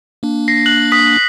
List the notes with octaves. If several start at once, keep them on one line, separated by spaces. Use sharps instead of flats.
A#3 D4
A#6 C7
F#6 F#7
D#6 B6